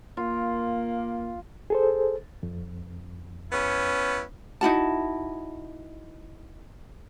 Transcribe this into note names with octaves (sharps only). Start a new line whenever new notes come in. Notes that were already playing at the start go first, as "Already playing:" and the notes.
A#3 F4
G#4 A4 C5
F2
B3 C#4 E4
D#4 E4 F#4 A5